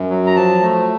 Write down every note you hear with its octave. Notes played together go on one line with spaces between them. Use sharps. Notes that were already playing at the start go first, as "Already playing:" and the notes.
Already playing: F#2
F#3
A#5
F3 A5
A3